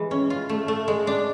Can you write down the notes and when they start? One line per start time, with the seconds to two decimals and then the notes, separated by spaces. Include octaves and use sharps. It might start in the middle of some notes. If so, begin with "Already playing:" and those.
Already playing: E3 G#3
0.11 C#4
0.30 F4
0.49 A3
0.68 A3
0.88 G#3
1.07 D4